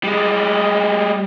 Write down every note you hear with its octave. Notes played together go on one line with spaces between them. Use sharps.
G3 G#3